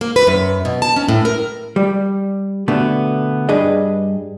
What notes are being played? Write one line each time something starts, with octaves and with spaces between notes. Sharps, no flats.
A#3
B4
F#2
B2
A5
C#4
A2
A#4
G3
B2 D3 A3 B3
G2 G3 D4 G#4 B4 D#5